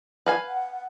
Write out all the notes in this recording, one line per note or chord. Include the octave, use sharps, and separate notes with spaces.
B4 F5 G#5
F#5